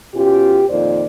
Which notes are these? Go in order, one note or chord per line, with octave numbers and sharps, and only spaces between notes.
B2 C#4 F4 G4
F2 A#2 D#3 C5 D5